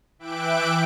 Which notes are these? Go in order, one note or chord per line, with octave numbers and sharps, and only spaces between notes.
E3 E5 G5 D6 F#6 D7